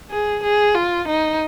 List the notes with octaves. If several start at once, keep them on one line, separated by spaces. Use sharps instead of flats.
G#4
G#4
F4
D#4